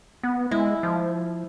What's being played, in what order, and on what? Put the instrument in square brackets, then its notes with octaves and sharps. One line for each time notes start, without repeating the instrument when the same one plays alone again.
[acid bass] B3
[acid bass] G#3 [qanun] E4
[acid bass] F3